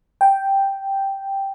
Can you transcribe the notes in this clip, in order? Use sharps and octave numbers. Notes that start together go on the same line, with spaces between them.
G5